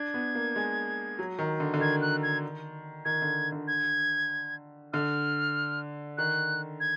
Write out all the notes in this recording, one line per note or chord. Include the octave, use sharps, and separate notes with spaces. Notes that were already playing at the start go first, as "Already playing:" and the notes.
Already playing: D4 G#6
B3
A#3
G#3
F#3
D#3
D3
D3
D#3 G#6
F#6
G#6
D#3 G#6
D3
D3
G#6
D3 F6
D#3 F#6
G#6